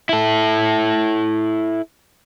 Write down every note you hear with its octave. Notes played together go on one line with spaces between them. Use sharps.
E4 A4